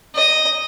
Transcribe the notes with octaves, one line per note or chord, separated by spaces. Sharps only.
D#5